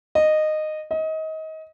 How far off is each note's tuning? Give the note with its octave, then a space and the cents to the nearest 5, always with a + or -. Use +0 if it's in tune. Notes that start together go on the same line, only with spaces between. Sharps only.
D#5 -15
D#5 +25